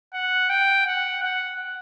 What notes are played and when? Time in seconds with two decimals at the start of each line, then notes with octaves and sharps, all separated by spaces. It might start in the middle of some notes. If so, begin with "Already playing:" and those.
0.13 F#5
0.50 G5
0.86 F#5
1.23 F#5